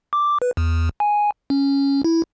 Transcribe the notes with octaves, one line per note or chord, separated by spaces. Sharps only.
D6
B4
E2
G#5
C#4
E4